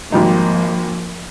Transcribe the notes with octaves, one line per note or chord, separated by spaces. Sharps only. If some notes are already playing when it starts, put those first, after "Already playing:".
G#1 F3 G3 A#3 D#4